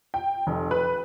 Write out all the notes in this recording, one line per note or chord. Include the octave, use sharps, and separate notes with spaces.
G5
F1
B4